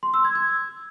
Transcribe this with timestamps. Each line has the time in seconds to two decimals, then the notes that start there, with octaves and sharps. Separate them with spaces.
0.03 C6
0.14 E6
0.25 G#6
0.35 G#6